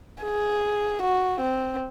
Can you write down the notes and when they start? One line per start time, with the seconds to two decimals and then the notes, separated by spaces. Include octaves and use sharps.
0.23 G#4
1.02 F#4
1.40 C4